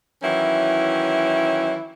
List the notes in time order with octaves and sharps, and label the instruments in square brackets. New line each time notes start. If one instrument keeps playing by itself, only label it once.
[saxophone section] D#3 E3 F#3 C#4 E4